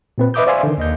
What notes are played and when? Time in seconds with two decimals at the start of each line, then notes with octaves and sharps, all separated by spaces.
0.18 A#2 C4 B4
0.34 B4 D#5 E5 D6 D#6 G6
0.47 C5 D5 E5 F5 G#5 C6
0.63 D3 D#3
0.78 D#2 D#5 G6